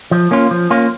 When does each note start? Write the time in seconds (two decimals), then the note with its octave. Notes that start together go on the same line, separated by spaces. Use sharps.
0.11 F3
0.31 A#3 C#4 F4
0.51 F3
0.70 A#3 C#4 F4